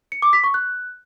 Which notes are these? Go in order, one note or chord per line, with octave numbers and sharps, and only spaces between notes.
C#7
D6
B6
C#6
F#6